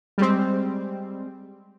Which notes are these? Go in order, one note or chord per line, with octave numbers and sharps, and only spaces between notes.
G3 G#3 C4